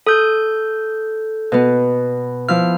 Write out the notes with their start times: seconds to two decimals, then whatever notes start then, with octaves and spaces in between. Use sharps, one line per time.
0.07 A4 D#6 G6
1.52 B2 B3
2.49 F3 E4 F6